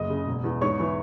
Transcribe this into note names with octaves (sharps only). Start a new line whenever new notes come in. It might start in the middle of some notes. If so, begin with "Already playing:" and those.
Already playing: F#1 D#5 D#6
C#3
E1
E2
G#2 C#5 C#6
E3